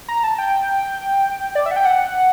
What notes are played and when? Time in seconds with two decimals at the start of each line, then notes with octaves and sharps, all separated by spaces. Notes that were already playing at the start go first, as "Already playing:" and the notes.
0.09 A#5
0.24 A5
0.38 G5
1.55 D5
1.66 E5
1.71 F#5
1.76 G5
1.85 F#5